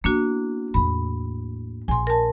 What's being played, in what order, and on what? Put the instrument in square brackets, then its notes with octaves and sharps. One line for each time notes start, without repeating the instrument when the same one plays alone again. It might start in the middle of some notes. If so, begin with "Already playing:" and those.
[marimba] A#3 D4 F#4 [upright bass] B3 E4
[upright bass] E2 A2 [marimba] B5
[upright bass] A#1 [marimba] G#5 C6
[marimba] A#4 A5